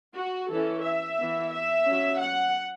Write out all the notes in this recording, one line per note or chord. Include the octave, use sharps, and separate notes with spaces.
F#4
E3 C#4 A4
E5
E3 B3
E5
F#3 C#4
F#5